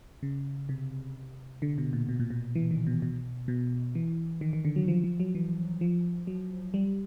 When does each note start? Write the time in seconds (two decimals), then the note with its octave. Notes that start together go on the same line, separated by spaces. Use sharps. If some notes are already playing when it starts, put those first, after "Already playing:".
0.23 C#3
0.69 C3
1.62 D3
1.78 B2
1.93 A#2
2.09 B2
2.20 A#2
2.30 B2
2.55 E3
2.71 D#3
2.87 B2
3.02 B2
3.48 B2
3.95 E3
4.41 D#3
4.53 D#3
4.65 D3
4.76 F#3
4.88 F3
5.04 F3
5.20 F#3
5.35 E3
5.81 F3
6.27 F#3
6.74 G3